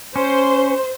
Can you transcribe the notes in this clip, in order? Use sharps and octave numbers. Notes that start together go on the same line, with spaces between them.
C#4 C5